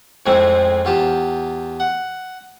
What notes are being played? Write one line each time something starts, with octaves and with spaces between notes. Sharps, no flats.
F2 A2 F3 G#3 A3 C4
E2 F4 G4 A5
F#5